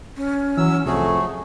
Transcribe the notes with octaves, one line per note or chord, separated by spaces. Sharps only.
C#4
E3 F#3 E6
C2 F2 F#3 A3 G#4 C#6